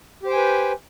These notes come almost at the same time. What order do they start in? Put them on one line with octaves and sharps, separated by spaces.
G4 C5 G5 G#5 B4